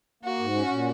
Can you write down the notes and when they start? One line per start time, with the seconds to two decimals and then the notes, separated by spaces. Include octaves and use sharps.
0.23 A#3 F#4
0.39 G#2
0.55 C#4
0.70 A#2